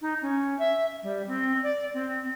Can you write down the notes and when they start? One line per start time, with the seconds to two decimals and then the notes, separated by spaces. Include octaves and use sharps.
0.01 D#4
0.21 C#4
0.59 E5
1.02 G3
1.27 C4
1.63 D5
1.93 C4